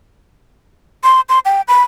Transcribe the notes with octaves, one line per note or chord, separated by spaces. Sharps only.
C6
C6
G5
B5